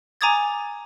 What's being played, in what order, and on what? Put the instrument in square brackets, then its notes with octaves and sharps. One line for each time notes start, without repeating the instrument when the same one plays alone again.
[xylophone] G#5 A#5 D6 D#6 G#6 A6